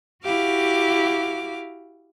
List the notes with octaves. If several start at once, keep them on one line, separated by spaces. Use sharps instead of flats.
E4 F#4 G4 F5 D6